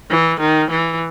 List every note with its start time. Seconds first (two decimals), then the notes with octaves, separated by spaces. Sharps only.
0.10 E3
0.40 D#3
0.71 E3